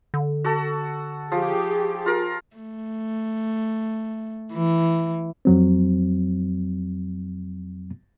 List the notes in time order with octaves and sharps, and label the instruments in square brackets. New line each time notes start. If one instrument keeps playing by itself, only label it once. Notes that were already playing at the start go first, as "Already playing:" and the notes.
[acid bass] D3
[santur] F#4 A4
[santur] F3 [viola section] G4 G#4
[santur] F4 A#4
[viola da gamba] A3
E3
[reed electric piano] F2 F#3 C4